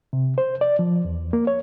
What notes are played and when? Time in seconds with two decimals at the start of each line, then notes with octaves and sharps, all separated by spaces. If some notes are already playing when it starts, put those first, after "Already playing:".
0.13 C3
0.38 C5
0.61 D5
0.79 F3
1.05 E2
1.33 A#3
1.47 C#5